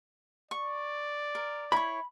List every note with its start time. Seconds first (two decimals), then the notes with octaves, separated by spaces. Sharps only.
0.51 D5 C#6
1.35 A#4
1.72 E4 C#5 B5